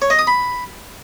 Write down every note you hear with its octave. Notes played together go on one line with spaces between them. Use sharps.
C#5
D#5
D#6
B5